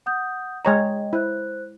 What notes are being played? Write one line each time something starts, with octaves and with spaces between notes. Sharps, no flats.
F#5 D#6 G6
G#3 C#5 D#5 G5 A#5
E4 C5 F#6